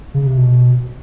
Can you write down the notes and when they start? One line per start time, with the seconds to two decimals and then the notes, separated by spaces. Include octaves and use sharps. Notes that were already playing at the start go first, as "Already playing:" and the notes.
0.14 C#3
0.26 C3
0.37 B2